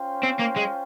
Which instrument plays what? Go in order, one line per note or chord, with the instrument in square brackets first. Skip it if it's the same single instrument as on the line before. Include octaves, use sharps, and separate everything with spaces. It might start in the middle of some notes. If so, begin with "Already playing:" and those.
Already playing: [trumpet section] C#4 F4 C5 G5
[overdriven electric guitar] C4
A#3
G#3